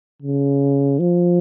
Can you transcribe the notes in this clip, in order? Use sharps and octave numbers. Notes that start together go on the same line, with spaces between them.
C#3
F3